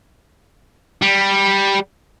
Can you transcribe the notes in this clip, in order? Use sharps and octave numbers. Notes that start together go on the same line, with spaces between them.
G3